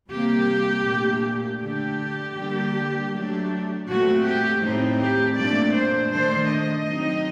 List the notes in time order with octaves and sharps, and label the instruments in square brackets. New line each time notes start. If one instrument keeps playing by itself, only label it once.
[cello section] C3 G3 A#3 G4
A#2 A3 D4
D3 A3 D4 G4
D3 G3 A#3 D4
F#3 A3 D4
A#2 A3 C4 F#4
G4
A2 A3 C4 D#4
G4
A#2 A3 D4 D5
C5
D#3 A3 D4 C5
D#5
F#3 C4 D#4